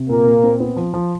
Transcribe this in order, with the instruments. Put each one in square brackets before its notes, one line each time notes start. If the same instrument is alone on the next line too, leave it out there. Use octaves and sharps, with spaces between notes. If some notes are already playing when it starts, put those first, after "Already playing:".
Already playing: [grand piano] C3
[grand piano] A#2 [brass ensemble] A#3 A#4
[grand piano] A#2
C4
B3
F3
F3